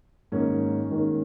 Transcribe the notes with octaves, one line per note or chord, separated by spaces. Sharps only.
G#2 D#3 A#3 C#4
G#2 D#3 A#3 C#4